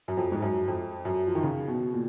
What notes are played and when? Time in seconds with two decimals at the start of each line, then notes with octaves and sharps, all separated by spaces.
0.08 F#2
0.17 F2
0.32 G#2
0.42 F#2
0.68 F2
1.05 F#2
1.27 F3
1.35 D#3
1.43 C#3
1.68 B2
1.93 A#2